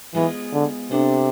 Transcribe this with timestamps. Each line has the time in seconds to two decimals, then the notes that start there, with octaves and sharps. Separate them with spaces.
0.14 E3 G#3 B3 F4 G#4 C5
0.53 D3
0.91 C3 B3 D4 A4 C5